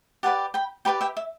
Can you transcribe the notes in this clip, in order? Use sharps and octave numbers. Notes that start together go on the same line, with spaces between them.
G4 B4 D5 F#5 A5
G5 B5
G4 B4 D5 G5 B5
E5 G5
E5